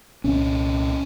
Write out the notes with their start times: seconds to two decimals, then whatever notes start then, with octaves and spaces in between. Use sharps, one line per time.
0.24 C2 A#2 C#4